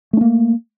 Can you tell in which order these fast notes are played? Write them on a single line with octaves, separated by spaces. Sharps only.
A3 D4 A#3